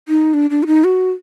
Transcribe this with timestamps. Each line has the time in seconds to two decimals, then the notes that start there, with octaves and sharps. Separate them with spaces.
0.09 D#4
0.34 D4
0.50 D4
0.63 F#4
0.67 D#4
0.84 F#4